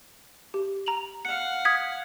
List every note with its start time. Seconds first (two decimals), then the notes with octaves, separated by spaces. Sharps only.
0.54 G4
0.86 A#5 F7 F#7
1.25 F5 F#5 C#7
1.65 D#6 G#6 B6